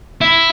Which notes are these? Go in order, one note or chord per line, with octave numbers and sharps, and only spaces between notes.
E4